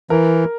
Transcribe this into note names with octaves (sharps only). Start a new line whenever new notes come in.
E3 A#4